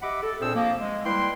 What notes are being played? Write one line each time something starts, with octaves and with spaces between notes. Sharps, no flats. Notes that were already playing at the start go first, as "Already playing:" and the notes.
G4 D#5 E5 F#5 B5 D6
A4
A#2 C4 D4 G#4 C5 E6
F3 A#3
G#3
G3 E4 B4 G5 C6